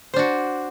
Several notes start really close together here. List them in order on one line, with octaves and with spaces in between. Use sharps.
C5 D4 F#4